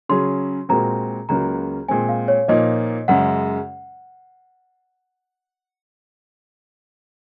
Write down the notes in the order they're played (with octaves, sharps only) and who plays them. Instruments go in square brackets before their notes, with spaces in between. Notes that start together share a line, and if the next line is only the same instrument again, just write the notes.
[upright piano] C#3 F#3 C#4 G#4 [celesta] C6
[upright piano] A#2 G#3 C4 F#4 A#4 [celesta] A#5
[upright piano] C#2 C#3 F#3 A#3 [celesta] A#5
[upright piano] A#2 G#3 C4 [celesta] G#5
[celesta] F5
C#5
[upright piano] A#2 F3 A#3 D#4 [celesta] D#5
[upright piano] F#2 C#3 G#3 [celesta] F#5